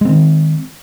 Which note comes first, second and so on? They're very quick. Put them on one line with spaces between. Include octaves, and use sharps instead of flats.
G#3 C4 D#3